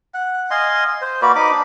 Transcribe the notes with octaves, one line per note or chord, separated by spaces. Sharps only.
F#5
D#5 F5 G#5 C6
C5
A#3 F#4 B4 D5
D#4 B5 D6
D4